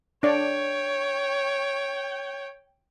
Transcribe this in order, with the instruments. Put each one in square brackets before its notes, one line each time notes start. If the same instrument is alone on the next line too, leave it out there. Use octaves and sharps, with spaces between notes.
[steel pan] D4 D5 [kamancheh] C#5 G5